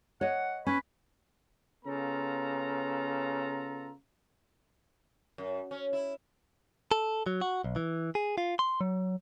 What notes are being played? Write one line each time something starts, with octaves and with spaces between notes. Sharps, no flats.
C#5 D#5 F#5
C#4 B4
C#3 B3 F4 A4 A#5
F#2
C#4
E4
A4
F#3
F#4
B1
E3
G#4
F4
C6
F#3